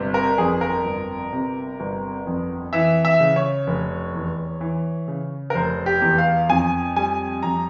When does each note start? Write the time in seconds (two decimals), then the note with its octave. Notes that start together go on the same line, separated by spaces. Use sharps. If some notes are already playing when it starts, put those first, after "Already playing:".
Already playing: G1 C3
0.14 A#4
0.38 F2 G#4
0.61 A#4
0.85 G1
1.33 C3
1.80 G1
2.27 F2
2.73 E3 E5
3.05 E5
3.20 C#3
3.36 C#5
3.67 F1
4.14 E2
4.61 E3
5.08 C#3
5.50 A#4
5.55 F1 C5
5.86 G4
6.02 E2
6.18 F5
6.49 F2 G#5
6.96 G3 G#5
7.43 F2 A#5